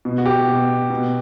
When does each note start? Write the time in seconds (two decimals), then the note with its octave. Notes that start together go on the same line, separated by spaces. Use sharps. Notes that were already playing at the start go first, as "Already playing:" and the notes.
0.05 B2
0.18 F#4
0.26 G4
0.48 B2
0.90 B2